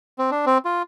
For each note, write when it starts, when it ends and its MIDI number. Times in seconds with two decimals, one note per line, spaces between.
0.19 0.30 60
0.31 0.45 62
0.46 0.58 60
0.65 0.82 65